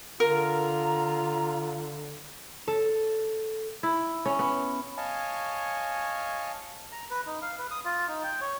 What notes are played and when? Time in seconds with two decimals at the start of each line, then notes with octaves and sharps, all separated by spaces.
0.20 D3 F4 A#4 A#5
2.68 A4
3.83 E4
4.26 C#4
4.39 B3
4.97 C#5 D#5 F5 G#5 A5 C#6
6.92 A#5
7.10 B4
7.26 D#4
7.42 F5
7.58 B4
7.71 D#6
7.85 F4
8.08 D#4
8.24 G5
8.41 C#5